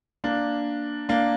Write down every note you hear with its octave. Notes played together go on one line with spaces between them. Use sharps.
A#3 D4
A#3 D4